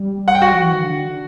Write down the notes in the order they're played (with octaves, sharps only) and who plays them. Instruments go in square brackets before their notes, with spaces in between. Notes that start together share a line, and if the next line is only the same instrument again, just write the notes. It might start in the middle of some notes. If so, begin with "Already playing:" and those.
Already playing: [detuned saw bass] G3
[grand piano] F#5
G5
F#4 F#5
[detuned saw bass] F3
E3
D#3
D3
D3